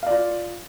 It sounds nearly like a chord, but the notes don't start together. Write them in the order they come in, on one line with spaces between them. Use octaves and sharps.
F5 D5 F4